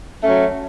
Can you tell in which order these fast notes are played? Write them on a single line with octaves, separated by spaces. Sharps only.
A3 C#4 F#3